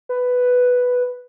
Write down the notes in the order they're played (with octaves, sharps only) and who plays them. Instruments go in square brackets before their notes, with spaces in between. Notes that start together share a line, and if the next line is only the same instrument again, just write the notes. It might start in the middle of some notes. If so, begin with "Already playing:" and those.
[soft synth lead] B4